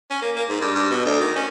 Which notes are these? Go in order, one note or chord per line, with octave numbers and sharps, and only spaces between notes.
C#4
A#3
A#3
G#2
G2
G2
B2
D2
D#3
C#4